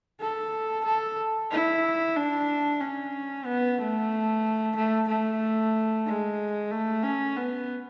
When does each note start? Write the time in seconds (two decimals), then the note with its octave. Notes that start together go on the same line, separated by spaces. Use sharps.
0.20 A4
0.85 A4
1.51 E4
2.16 D4
2.81 C#4
3.46 B3
3.78 A3
4.76 A3
5.08 A3
6.06 G#3
6.71 A3
7.03 C#4
7.37 B3